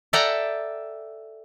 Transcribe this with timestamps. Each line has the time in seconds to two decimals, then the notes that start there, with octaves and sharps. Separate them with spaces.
0.13 A4 D5 E5 F#5 G5 A#5